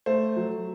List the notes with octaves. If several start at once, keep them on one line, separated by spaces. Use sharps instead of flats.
A3 C5
F#3